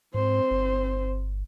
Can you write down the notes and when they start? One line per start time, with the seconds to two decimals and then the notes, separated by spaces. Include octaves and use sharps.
0.14 G#2 C4 C5
0.51 G1